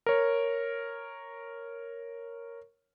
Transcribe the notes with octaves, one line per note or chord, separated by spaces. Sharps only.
A#4 C#5